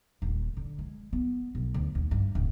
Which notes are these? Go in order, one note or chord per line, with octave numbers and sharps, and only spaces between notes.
D#1
D3
G#3
B3
B1
D2
D#2
G2
D1